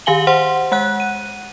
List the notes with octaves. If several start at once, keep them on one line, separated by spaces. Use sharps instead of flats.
D#3 G4 F5 G#5 F#7 G7
C5 F#5 C6
G#3 F#5 F#6
D#7